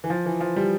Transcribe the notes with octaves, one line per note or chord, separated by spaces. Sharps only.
E3
F3
E3
F3
G3